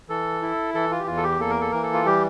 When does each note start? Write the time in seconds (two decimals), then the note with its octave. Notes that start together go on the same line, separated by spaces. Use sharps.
0.09 E3 A4
0.42 E4
0.74 E3 A4
0.91 F4
1.00 G4
1.07 E2 F4
1.17 A4
1.23 G4
1.40 A#3 A4
1.50 A#4
1.61 A4
1.72 E3 A#4
1.83 A4
1.94 F4
2.06 G3 G4